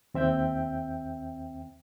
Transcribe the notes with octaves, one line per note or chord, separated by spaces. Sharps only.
D#2 C4 E5 G5 G6